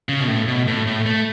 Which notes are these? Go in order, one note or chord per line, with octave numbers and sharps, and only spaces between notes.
C#3
B2
A2
B2
A2
A2
A3